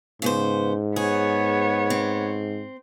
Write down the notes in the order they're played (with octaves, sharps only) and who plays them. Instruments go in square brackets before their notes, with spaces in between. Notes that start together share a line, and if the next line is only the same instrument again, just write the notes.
[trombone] G#2 [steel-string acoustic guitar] C#3 B3 C5
[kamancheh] B3 C#5 [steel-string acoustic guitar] G#4
[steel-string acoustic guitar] C4